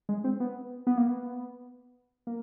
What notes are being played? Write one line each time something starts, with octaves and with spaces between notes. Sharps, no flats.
G#3
C4
B3
B3
A#3
B3
A#3